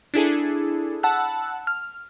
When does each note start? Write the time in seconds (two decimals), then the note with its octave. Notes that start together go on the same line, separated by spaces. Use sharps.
0.14 D4 E4 G#4 A4
1.03 F#5 A5 B5 E6 F#6
1.67 F6